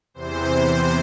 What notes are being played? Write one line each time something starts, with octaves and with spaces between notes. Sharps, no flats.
E2 C3 E3 C5